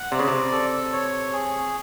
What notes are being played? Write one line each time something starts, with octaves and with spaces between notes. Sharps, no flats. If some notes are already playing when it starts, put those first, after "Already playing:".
Already playing: F#5
C3 D5
C#3
C3
A4
C#5
G#4